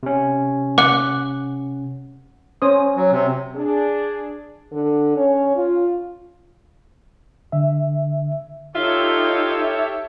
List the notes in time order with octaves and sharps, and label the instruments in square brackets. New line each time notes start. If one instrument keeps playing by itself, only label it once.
[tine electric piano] C3 C#4
[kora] F#5 [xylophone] D6 F#6
[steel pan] C#4 C5 D#6
[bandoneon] F#3
C3
[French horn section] D4 G#4
[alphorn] D3
C#4
F4
[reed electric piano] D3 E5
[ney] D#4 [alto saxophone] F4 [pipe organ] G4 A4 C#5 [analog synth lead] E5